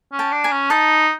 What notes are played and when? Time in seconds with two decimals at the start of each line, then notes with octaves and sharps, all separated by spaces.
0.13 C#4
0.19 G5 A5
0.32 D4
0.44 G#5 A#5
0.51 C#4
0.70 D#4 A5 B5